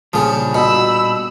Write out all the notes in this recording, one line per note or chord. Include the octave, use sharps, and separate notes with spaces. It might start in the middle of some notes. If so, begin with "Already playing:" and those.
A#2 C#3 F3 G3 D4
B2 B5 E6